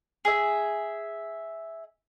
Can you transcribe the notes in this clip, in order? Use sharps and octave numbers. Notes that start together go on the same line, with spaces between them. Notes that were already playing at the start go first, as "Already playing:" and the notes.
G#4 E5